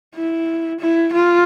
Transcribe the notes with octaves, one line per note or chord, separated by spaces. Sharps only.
E4
E4
F4